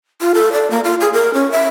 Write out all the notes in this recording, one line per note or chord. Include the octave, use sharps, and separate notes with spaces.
F4
A4
D5
A#3
F4
G#4
A#4
C#4
E5